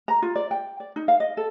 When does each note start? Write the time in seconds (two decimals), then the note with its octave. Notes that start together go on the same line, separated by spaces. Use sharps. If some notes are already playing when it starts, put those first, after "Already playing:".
0.08 A#5
0.22 F4
0.35 D5
0.51 G5
0.80 D5
0.96 D#4
1.08 F5
1.20 D#5
1.37 A4